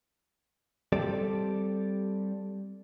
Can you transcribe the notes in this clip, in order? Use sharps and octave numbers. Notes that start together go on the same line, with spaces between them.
G3 C4 G4 A4 D5